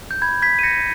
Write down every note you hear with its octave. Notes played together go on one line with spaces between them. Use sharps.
G6
B5 G#6
G#6 B6
D#7
G6 A#6 C#7